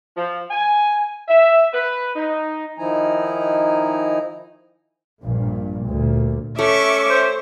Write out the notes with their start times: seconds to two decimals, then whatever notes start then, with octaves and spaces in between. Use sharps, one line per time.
0.16 F3
0.51 G#5
1.28 E5
1.73 B4
2.16 D#4
2.78 D#3 F3 D#4 E4 G#5 A#5
5.23 A#1 G2 A#2
5.87 D2 A#2
6.59 A3 C#4 E5 C#6 D6
7.10 C5